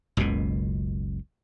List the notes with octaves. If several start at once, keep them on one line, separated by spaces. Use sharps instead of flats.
F#1 C#2 F#2 B2